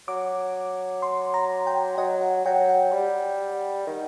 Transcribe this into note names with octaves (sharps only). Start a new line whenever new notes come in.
F#3 D6
C6
A#5
G5
F#3 D#5
F#5
F#3 G5
F#5
G3
D#3